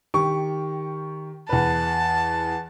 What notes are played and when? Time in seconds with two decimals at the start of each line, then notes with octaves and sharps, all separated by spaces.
0.14 D#3 G4 C#6
1.49 E2 B4 A5